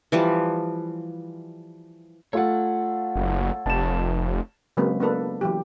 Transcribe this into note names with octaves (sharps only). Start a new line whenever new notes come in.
E3 F3 G3
A3 F4 A4 C#5 F#5
F#1
F1 A5 E7
C#3 F#3 G#3 A#3 C4 B4
A#3 B3 D4 A4 B4
E3 F#3 G4